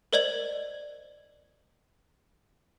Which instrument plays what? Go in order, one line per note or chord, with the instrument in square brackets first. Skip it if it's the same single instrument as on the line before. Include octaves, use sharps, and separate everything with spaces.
[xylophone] A#4 C5 D5 D#5 G#6 F#7